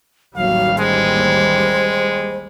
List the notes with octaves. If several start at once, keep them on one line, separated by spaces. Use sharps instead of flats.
A1 D#2 F#3 G3 F5
G#3 C5